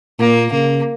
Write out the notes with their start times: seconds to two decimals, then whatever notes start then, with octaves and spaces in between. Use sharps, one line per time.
0.19 A#2 A#3
0.52 C#3 A#3